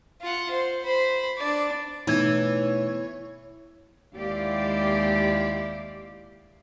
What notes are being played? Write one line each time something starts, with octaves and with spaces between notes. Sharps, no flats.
F4 F#5
C5
C5 B5
D4 D5
B2 E3 A3 B3 D#4 C#5 G#6
D#2 G#3 E4 G4 D5 F5